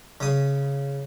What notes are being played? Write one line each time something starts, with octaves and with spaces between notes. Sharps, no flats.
C#3 D#6